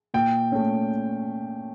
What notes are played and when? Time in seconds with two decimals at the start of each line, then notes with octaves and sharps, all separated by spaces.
0.14 A#2 G5
0.52 A3 C#4